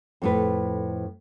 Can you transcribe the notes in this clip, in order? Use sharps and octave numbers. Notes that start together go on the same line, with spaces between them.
F2 A2 B4